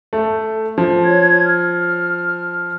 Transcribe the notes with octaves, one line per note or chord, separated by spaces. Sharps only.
A3
F3
C#5 G#6
F6